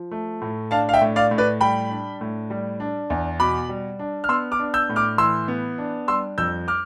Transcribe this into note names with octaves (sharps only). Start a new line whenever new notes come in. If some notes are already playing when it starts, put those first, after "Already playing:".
Already playing: F3
A3
A2
D4 F5 A5
F5
E5 G5
A2
D5 F5
A2
B4 D5
G3 G5 B5
D4
A2
G3
D4
E2
B2 B5 D6
G3
D4
F6
B3 C6 E6
D6 F6
D4
E6 G6
A2
D6 F6
E3 C6 E6
B3
D4
G3 C6 E6
F2 E6 G6
D6 F6